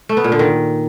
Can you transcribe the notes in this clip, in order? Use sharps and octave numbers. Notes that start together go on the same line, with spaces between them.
A3
B3
A#2
D3
D#3